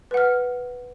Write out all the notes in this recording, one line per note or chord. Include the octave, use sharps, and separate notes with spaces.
B4 F#5 F6